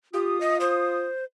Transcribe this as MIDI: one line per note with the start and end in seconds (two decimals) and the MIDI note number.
0.14 1.07 65
0.14 0.38 67
0.14 1.07 87
0.41 0.57 75
0.60 1.24 72